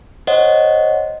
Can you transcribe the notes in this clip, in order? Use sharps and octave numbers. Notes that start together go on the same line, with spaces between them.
C5 C#5 D#5 F#5